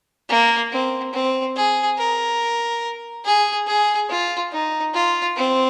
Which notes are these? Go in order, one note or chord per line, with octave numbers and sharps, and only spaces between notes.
A#3
C4
C4
G#4
A#4
G#4
G#4
F4
D#4
F4
C4